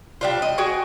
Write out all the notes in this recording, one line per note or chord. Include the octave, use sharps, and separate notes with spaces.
G3 D4 F4
D#5
F#4 G#4 G5